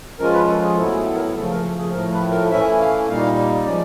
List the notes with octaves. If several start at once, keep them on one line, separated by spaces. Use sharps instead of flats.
F3 G#3 C#4 F4 A#4
B4
A4
G#4
A2 F#3 B3 E4 A4
G#4
A4
A#4
A4
C#3 F3 A3 A4
A#4
A4
G#4
A2 F3 A3 A#4
B4
A#4
E3 A3 C#4 E4 E5
F5
A#2 G3 A#3 D#4 F5
F3 G#3 C#4 D5